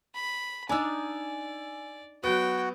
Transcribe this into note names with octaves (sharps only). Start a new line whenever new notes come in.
B5
D4 D#4 D5 G#5 E6
F#3 B3 F#4 G5